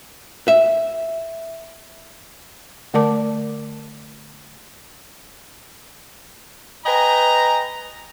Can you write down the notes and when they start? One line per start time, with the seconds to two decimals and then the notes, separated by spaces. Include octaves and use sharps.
0.48 E5
2.94 D3 A3 A#4 D5 A5 D6
6.85 B4 D#5 G5 G#5 A#5